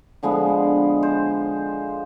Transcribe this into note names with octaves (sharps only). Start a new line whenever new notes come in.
D3 F3 G#3 B3
C5